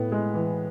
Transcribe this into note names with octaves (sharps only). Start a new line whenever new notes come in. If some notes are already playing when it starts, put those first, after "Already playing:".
Already playing: A2 B3
G#3
E3